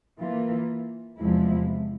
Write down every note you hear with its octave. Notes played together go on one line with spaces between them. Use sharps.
E3 A#3 F4
E2 C3 F3 G#3 E4